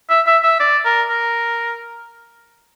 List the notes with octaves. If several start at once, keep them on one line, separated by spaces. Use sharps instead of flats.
E5
E5
E5
D5
A#4
A#4